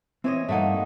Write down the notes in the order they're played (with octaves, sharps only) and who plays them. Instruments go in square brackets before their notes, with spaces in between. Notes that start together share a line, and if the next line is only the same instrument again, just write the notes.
[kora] E3 C#5 D#5 [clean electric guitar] C4
[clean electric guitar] G2 A#4 F#5 [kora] A3 A#3 D#4